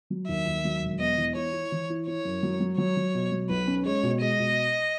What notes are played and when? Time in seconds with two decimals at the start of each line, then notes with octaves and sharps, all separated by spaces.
0.10 F#3
0.28 D#2 E5
0.47 D#2
0.65 F#3
0.82 E1
0.99 B3 D#5
1.17 E3
1.36 E4 C#5
1.53 E4
1.72 E3
1.90 E4
2.07 E4 C#5
2.25 F#2
2.43 F#3
2.60 F#3
2.78 F#3 C#5
2.97 F#3
3.15 B2
3.32 F#3
3.50 B1 B4
3.67 C#4
3.86 G#3 C#5
4.03 B2
4.21 G#3 D#5
4.39 B2